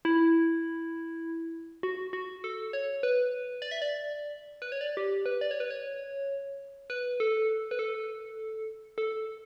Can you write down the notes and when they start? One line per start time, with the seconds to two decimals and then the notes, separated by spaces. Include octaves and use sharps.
0.05 E4
1.83 F#4
2.13 F#4
2.44 A4
2.73 C#5
3.03 B4
3.62 D5
3.71 E5
3.82 D5
4.62 B4
4.72 C#5
4.81 D5
4.97 G4
5.26 B4
5.41 D5
5.51 C#5
5.60 B4
5.71 C#5
6.90 B4
7.20 A4
7.71 B4
7.79 A4
8.98 A4